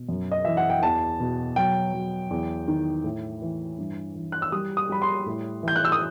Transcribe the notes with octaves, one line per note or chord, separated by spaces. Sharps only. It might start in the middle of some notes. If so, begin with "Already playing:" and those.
Already playing: B2
F#2
D#5
E3 E5
F#5
G5
E2 A5
B2
F#3 G5
F#3
E2
D#3
A2
E3
G2
E3
F#6
E6
G3 D#6
D#6
G3 B5
C6
A2
E3 G6
F#6
E6
D#6